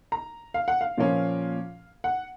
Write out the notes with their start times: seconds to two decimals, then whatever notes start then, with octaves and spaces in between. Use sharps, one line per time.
0.12 A#5
0.54 F5
0.68 F#5
0.81 F5
0.97 A#2 F3 A#3 C#4
2.04 F#5